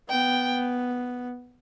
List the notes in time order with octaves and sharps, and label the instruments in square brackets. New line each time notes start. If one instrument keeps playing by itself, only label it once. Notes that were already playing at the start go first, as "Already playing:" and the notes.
[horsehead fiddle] B3 [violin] G5